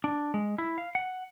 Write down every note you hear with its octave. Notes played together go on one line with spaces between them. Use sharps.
D4
G#3
E4
F5
F#5